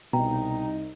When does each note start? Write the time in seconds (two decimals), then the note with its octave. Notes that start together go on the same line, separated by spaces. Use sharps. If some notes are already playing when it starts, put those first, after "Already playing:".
0.13 C2 B2 D#4 G5 A#5